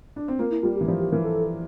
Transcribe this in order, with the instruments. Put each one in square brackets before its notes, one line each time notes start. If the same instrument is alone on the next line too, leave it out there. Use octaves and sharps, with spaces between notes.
[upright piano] D4
C4
[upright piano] A#3 [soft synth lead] F4
[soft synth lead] E4
[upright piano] G3 [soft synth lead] F4
[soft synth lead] G4
[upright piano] E3
[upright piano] F3 [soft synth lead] G4
[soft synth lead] G4
[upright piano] E3 [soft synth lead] A#4
[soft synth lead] A4